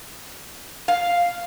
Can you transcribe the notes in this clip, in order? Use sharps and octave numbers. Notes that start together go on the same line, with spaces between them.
F5